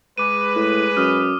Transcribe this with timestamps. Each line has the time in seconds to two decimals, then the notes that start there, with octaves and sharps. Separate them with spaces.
0.18 G#3 B4 D6 D#7
0.56 A2
0.97 F#2 D#6 F6